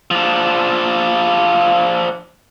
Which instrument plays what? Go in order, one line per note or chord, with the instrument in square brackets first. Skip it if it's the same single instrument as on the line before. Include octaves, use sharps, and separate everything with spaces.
[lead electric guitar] F3 D4